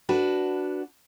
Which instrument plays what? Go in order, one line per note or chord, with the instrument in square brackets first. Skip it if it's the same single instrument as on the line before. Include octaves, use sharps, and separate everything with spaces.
[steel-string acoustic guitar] D4 F#4 B4